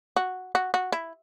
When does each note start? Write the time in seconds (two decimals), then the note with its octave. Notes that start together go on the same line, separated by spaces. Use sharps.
0.16 F#4
0.55 F#4
0.74 F#4
0.92 E4